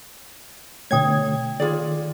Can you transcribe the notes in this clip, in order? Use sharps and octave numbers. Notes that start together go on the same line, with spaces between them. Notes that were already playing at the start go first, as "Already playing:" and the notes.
B2 D3 A3 C#5 G5 D#6 G#6
D#3 F4 G#4 D5